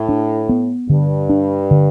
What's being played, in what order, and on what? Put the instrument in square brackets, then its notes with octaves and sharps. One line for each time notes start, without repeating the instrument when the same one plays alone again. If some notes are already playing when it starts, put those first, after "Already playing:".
Already playing: [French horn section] A2
[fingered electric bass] D4
B3
[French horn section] G2 [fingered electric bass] D3
[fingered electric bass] D4
D3